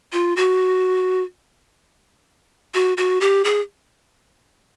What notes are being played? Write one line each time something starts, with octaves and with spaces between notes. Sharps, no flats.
F4
F#4
F#4
F#4
G4
G#4